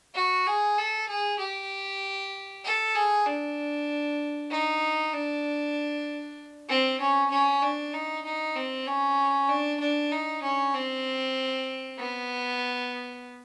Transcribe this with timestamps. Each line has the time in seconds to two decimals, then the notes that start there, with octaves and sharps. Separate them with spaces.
0.15 F#4
0.47 G#4
0.78 A4
1.09 G#4
1.39 G4
2.65 A4
2.95 G#4
3.27 D4
4.51 D#4
5.13 D4
6.69 C4
7.00 C#4
7.31 C#4
7.62 D4
7.93 D#4
8.25 D#4
8.55 C4
8.87 C#4
9.49 D4
9.80 D4
10.11 D#4
10.42 C#4
10.74 C4
11.99 B3